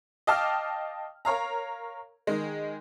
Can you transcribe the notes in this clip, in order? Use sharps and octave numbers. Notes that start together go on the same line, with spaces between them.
D#5 F5 G5 A5 D6 F6
A#4 C#5 F5 A#5
D#3 G#3